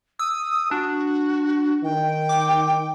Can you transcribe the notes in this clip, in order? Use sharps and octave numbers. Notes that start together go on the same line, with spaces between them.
D#6 E6
D4 F#4
D#3 G5
D6